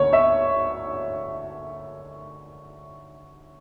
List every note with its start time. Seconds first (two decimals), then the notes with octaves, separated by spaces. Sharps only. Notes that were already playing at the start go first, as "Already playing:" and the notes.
Already playing: D2 D3 A#3 C#5
0.13 E5